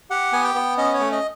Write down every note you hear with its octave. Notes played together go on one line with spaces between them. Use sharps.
G4 F#5
B3 G#5
G5
B3
C#4 D#5
C#5
A3
D#5